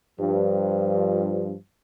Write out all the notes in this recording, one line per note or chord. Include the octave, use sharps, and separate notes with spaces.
G2 F3